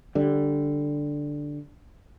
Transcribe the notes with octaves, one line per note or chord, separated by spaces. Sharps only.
D3 G3